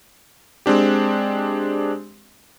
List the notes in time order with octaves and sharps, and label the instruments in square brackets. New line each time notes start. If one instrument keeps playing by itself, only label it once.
[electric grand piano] G#3 C4 D4 G4